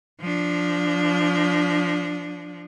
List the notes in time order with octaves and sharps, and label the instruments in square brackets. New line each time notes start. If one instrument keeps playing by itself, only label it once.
[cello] F3 D4